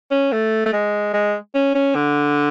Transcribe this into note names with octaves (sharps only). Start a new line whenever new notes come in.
C#4
A3
A3
G#3
G#3
C#4
C#4
D3